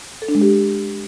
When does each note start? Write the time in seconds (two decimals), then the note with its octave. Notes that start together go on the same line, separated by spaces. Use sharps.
0.22 A4
0.28 D4
0.35 G#3
0.41 G4